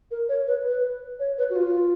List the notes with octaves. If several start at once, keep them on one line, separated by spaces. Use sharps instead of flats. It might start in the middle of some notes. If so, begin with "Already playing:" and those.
A#4
C#5
B4
B4
C#5
B4
F#4
F4